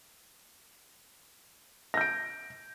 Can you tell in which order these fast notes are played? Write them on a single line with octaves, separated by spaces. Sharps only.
A#6 G6 D7